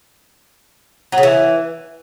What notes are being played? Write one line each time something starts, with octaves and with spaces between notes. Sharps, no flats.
F#3
C#3
E3